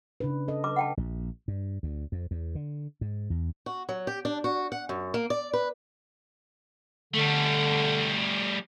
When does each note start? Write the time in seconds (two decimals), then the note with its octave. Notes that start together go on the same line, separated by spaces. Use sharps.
0.20 C#3 D4 B4
0.48 A4 D#5
0.64 B4 D6
0.76 F#5 G5 A5
0.97 A#1
1.48 G2
1.83 D2
2.12 F2
2.31 E2
2.55 D3
3.01 G#2
3.30 E2
3.66 F#4
3.89 F#3
4.07 G4
4.25 D4
4.44 F#4
4.72 F#5
4.89 F#2
5.14 A#3
5.30 D5
5.53 B4
7.14 D3 G3 A3